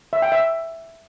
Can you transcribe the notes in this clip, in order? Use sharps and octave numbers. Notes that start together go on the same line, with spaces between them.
E5
G5
E5